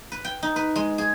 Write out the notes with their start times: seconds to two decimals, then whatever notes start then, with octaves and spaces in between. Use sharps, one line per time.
0.12 B4
0.25 G5
0.43 D#4
0.56 B4
0.76 G#3
0.98 G#4